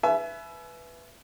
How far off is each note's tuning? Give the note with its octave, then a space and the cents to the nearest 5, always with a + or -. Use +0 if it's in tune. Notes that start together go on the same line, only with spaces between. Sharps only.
B4 +0 E5 +20 G#5 +40